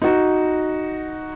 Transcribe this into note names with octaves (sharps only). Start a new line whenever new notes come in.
D#4 F#4